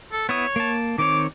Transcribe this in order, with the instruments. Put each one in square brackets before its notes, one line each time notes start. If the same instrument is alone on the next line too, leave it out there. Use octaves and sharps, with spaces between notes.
[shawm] A4
[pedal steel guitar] B3 E4 D#6 [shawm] C#5
[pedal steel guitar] A#3 A5
[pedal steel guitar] D#3 C4 C#5 [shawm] D6